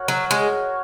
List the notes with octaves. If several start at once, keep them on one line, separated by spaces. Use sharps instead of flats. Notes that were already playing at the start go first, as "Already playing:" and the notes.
Already playing: F#4 A#4 C#5
F#3
G#3